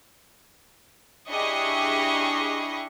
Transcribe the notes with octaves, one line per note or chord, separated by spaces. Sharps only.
D4 E4 G4 G#4 D#5 C#6